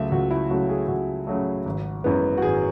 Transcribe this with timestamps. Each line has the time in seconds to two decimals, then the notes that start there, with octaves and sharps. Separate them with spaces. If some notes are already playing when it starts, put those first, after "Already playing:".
Already playing: C#2 C#3 F#3 A3 E5
0.12 C#2 F#4
0.31 E4
0.50 C#3 F#3 A3 F#4
0.69 G#4
0.88 C#2 F#4
1.27 C#3 F#3 A3
1.65 G#1
2.04 F#2 E3 G#3 B3
2.38 F#4
2.42 G#1 G#4